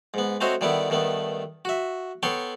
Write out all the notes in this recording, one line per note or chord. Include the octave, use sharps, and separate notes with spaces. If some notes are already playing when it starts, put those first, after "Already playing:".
G#2 B3
A3 C4 F#4 C5 C#5 D#5
D3 D#3 G3 B3 E4
G2 D#3 A3 B3
F#4 E5
B3 A4 C#5 G5 C6 C#6